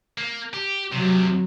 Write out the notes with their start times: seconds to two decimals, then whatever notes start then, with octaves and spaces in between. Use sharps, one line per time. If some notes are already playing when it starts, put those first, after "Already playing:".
0.18 A#3
0.54 G4
0.92 F2 C3 F#3